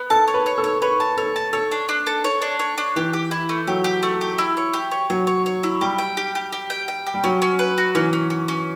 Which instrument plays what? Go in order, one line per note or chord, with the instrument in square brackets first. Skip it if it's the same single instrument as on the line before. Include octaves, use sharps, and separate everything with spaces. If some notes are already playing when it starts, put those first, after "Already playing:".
Already playing: [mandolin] B3
[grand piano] A4 [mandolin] A5
[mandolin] C#5
[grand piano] B4
[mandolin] C#5
[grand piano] A4
[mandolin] C#5
[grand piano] B4 [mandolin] C#5
[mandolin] A5
[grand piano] A4 [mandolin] C#5
[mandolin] A5
[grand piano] A4 [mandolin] C#5
[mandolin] D4
D4
A4
C#5
D4
C#5
D4
[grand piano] E3 [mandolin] G4
[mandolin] G4
E4
A3
[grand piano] F#3 [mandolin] G4
[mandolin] G4
A3
G4
E4
C#5
G4
C#5
[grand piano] F#3 [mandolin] C#5
[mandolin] C#5
C#5
E4
[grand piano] G3 [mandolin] G4
[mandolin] G5
G4
G4
G4
G5
G5
G4
[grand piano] G3
[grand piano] F#3 [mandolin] C#4
[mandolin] C#4
B4
F#4
[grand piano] E3 [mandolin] C#4
[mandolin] C#4
C#4
C#4